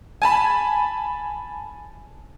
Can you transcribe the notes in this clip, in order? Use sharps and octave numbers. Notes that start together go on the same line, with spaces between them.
G#5 A5 B5